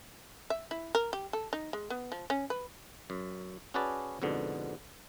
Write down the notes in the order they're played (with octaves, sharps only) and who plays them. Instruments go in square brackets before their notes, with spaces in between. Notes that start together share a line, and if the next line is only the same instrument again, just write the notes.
[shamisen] E5
E4
A#4
G4
A4
D#4
G#3
B3
F3
C#4
B4
[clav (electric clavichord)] F#2
C#4 F#4 G#4 B4 D5 A5
F2 G#2 B2 D3